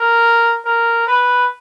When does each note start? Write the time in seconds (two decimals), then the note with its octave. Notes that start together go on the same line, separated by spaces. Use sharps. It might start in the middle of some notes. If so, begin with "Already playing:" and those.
Already playing: A#4
0.65 A#4
1.07 B4